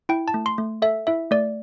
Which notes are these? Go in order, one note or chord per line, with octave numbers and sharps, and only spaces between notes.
E4 G5
A5
A3
C6
A3
A4 E5
E4 E5
A3 D5